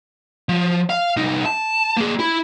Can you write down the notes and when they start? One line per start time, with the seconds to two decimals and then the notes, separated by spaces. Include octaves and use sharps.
0.49 F3
0.90 F5
1.17 C2 D#4
1.46 A5
1.97 A#3 G#4
2.19 E4